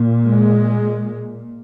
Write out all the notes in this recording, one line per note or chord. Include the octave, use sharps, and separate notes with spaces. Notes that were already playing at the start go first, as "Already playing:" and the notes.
Already playing: A#2
G#3